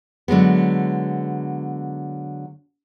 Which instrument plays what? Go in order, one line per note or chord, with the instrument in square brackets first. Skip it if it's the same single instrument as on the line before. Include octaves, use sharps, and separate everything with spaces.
[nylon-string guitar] D3 F#3 G#3 B3